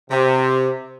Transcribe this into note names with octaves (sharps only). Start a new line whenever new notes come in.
C3